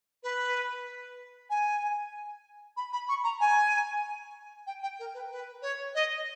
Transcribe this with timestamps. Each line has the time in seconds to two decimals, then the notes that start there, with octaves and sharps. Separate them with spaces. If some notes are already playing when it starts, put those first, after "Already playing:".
0.23 B4
1.50 G#5
2.77 B5
2.93 B5
3.09 C#6
3.24 A#5
3.40 G#5
4.67 G5
4.83 G5
4.99 A#4
5.14 B4
5.31 B4
5.62 C#5
5.95 D#5